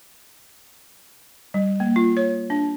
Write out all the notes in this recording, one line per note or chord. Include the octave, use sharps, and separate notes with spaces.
G3
A#3
F4
C#5
D4